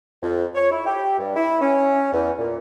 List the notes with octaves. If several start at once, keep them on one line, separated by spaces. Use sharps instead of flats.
F2
C#5
E4
G4
G2
E4
C#4
E2
A#2